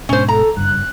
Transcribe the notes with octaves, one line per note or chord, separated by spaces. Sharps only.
G#2 B2 C#4 C5
A4 A#5
F#1 G2 F#6